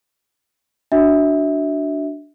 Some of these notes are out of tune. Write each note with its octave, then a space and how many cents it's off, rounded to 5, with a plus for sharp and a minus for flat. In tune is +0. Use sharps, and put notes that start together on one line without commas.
D4 +0 F#4 +0 E5 -25